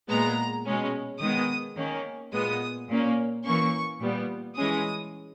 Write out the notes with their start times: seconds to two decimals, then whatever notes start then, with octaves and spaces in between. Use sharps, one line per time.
0.09 A#2 G#3 B3 A#5
0.66 B2 G#3 C#4
1.20 D#3 G#3 B3 D#6
1.77 D#3 A#3 C#4
2.33 A#2 G#3 B3 D#6
2.89 A#2 A#3 C#4
3.44 E3 A#3 C#4 C#6
4.00 A#2 G3 B3
4.57 E3 G#3 C#4 D#6